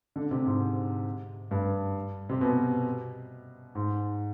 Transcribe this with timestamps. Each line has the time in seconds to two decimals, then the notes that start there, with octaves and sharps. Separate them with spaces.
0.16 D3
0.31 C3
0.46 G#2
1.51 G2
2.29 C3
2.41 B2
3.75 G#2